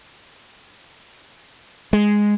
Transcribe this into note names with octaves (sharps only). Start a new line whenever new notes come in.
G#3